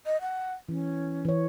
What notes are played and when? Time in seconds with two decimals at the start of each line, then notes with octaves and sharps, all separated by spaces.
0.06 D#5
0.21 F#5
0.69 E3 C#4
1.25 E3 C#5